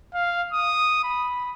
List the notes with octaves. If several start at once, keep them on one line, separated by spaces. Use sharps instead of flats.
F5
D#6
B5